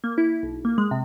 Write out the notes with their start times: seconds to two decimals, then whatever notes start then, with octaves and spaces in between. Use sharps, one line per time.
0.04 A#3
0.18 E4
0.43 B1
0.65 A#3
0.78 G#3
0.91 C3